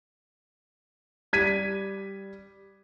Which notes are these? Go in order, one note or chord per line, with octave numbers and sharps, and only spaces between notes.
G3 G#6 B6 D#7